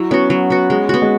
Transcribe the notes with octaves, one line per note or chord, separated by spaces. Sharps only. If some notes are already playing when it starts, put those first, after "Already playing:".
Already playing: F#3 E4
B3 C#4 F#4
F#3
B3 F#4
G#3
B3 F#4
G#3